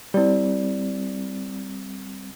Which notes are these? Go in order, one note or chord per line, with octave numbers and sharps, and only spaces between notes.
G3 C4 E4 D5